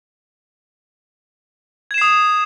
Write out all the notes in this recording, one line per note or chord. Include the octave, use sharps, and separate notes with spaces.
D#6 G#6 C7 E7